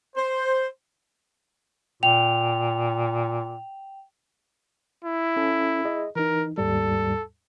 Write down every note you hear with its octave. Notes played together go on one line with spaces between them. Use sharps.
C5
A#2 G5 F7
E4
C#4 A4
G#4 D#5
E3 D#4 A#4
D#2 G#2 G3 A4